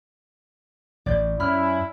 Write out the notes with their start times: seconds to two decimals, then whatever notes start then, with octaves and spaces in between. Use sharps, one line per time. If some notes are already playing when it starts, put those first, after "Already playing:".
1.06 A1 D5 G6
1.40 F#2 C#4 E4 B5 F6